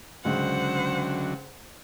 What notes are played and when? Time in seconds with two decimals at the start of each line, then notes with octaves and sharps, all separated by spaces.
0.25 C#2 D3 F#3 C5 F#5